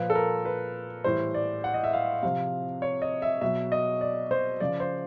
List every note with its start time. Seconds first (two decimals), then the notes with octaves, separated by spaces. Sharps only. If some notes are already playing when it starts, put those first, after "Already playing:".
Already playing: A#2 F3 B4
0.10 A4
0.15 A#4
0.45 B4
1.04 A2 E3 G3 C5
1.34 D5
1.64 F#5
1.74 D#5
1.84 E5
1.93 F5
2.23 C3 F3 F5
2.82 C#5
3.02 D#5
3.22 E5
3.41 B2 F#3 E5
3.72 D#5
4.01 D5
4.31 C5
4.60 C#3 F3 D5
4.80 C5